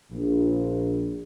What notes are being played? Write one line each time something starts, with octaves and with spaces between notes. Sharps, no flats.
A#1